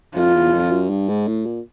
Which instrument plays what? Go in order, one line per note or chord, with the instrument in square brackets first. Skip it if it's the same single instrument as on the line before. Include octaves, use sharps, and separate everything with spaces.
[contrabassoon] F2 [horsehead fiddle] F4
[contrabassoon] E2
F2
F#2
G2
G#2
A2
A#2